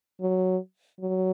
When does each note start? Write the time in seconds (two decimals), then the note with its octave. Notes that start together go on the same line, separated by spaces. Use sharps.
0.21 F#3
1.01 F#3